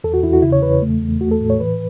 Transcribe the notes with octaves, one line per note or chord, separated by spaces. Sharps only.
E2 A4
F#4
E2 E4
F#4
C#3 E4
C#5
E2 B4
A3
E2
A3 F#4
A4
A2
C#5
E3 B4